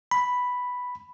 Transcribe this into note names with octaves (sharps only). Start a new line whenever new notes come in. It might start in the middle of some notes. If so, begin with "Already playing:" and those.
B5